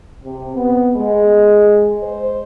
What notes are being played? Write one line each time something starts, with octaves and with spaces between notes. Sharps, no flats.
C3
B3
G#3
C5